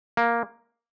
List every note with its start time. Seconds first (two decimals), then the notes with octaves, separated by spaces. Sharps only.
0.17 A#3